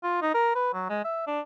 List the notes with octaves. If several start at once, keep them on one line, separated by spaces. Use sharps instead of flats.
F4
D#4
A#4
B4
F#3
G#3
E5
D4